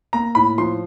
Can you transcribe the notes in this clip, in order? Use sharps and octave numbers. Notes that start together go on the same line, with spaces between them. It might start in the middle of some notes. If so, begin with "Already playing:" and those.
A#3 A#5
A2 B5
F3 C6